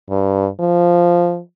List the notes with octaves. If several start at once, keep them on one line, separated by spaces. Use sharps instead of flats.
G2
F3